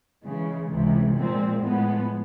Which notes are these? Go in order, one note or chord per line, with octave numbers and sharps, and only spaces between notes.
C#3 E3 G#3
C#2 C3 E3
A#2 F3 G#3 C4
A2 F3 G#3 B3